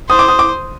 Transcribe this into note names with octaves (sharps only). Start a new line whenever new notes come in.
C5 D#6
D6
D#6
D6